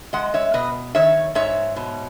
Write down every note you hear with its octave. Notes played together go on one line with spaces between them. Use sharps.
G#3 D#5 F#5
C#5 E5
B2 B4 D#5
D#3 C#5 E5
G#2 C#5 E5
B2